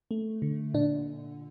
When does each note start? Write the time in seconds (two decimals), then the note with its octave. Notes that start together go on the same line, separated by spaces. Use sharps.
0.11 A3
0.42 D3
0.74 A#2 D4